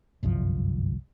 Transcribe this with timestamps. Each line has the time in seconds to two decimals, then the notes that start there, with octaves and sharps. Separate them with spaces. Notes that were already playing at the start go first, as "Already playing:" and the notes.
0.23 G1 C2 F#2 F3